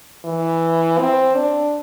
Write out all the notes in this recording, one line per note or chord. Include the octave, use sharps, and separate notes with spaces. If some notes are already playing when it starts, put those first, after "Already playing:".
E3
C4
D4